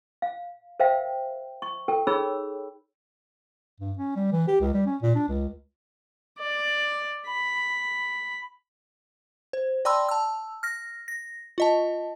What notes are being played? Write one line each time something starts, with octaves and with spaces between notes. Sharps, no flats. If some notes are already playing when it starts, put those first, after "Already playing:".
F5
A#4 C5 E5 F5 G5
C#6
A4 A#4 G5
D#4 G#4 A#4 C#5 B5 E6
G2
C#4
G3
E3
G4
C#2
G3
C#4
A#2
D4
C#2
D5
B5
C5
D5 G5 A5 B5 C6 E6
A5 E6
F6 A#6
A#6
F4 D#5 A5